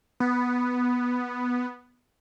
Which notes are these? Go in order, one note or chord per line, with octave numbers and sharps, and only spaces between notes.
B3